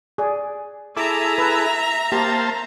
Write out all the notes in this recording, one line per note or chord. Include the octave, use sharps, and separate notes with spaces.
G#4 D5
E4 G#4 A4 E5 A#5 D6
B4
A#3 G4 C5 A5